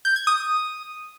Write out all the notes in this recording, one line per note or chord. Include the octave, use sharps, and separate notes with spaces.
G6
G#6
D#6